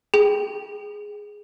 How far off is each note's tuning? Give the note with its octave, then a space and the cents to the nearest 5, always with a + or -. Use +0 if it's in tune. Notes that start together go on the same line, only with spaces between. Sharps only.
G#4 +0 G5 +0